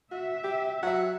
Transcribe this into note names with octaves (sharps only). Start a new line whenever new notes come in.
F#4 E5
G4
F#3 E5 F#5